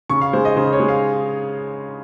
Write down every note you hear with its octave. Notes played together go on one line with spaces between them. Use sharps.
C#3 C#6
F5
G#3 C5
D#5
C#3 C5
C#5
G#3
F5